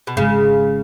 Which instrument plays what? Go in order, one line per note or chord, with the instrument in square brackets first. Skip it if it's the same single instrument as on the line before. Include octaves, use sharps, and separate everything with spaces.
[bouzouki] B2
[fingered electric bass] G#1 G#2 G#3 [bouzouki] C#3